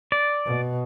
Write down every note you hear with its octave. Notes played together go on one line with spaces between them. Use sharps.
D5
B2